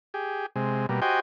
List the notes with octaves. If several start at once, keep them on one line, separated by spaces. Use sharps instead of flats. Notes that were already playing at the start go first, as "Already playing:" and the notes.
G4 G#4
C3 G#3
B2 G3 A#3
F#4 G4 C5 D#5 G5 G#5